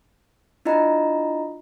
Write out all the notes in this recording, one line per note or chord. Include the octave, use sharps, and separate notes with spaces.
D4 E4 F4 D#5 A#5